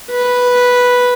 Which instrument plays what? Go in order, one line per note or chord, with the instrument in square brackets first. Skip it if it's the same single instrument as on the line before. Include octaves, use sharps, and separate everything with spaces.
[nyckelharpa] B4